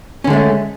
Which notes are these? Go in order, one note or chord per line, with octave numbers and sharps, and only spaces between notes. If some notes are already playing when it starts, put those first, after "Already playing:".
D3 G#3 A3 C#4